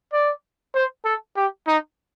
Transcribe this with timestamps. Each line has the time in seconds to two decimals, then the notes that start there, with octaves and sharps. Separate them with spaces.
0.13 D5
0.75 C5
1.05 A4
1.36 G4
1.68 D#4